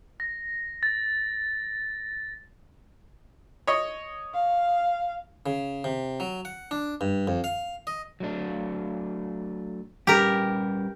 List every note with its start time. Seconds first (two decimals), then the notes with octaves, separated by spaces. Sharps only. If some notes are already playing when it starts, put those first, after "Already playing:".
0.20 A#6
0.83 A6
3.67 C#5 D#5
4.34 F5
5.46 C#3
5.84 C3
6.20 F#3
6.45 F#5
6.71 D4
7.01 G2
7.27 F2
7.44 F5
7.87 D#5
8.20 F#3 A3 D4
10.07 G3 C#4 G4 A#4 B4